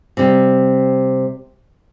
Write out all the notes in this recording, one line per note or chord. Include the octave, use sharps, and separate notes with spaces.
C3 G3